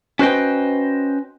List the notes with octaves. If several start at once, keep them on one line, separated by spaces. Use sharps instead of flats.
C#4 F#4 B4 C5 D#5 G5